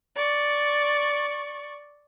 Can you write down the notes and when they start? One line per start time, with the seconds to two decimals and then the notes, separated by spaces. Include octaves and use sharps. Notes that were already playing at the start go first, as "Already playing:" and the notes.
0.15 D5 C#6